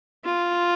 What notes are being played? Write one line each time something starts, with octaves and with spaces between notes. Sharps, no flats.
F4